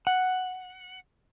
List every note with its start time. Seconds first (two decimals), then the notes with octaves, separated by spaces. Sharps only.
0.07 F#5